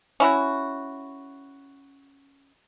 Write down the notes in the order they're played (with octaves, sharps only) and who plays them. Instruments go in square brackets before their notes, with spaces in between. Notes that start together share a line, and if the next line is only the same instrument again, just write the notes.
[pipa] C#4 E4 F#4